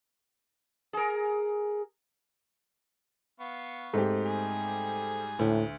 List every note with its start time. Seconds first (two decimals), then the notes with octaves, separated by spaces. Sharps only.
0.93 G#4 A#4
3.40 B3 F5 C#6
3.94 G#2 A3 C4 G4
4.25 G3 G#4 G#5
5.39 D2 A2